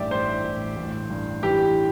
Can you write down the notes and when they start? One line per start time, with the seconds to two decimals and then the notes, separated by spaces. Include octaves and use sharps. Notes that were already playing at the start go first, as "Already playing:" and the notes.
Already playing: A1 G2 G4 D5 E5
0.11 E3 C5
0.44 A1
0.76 A1
1.10 G2
1.43 E3 G4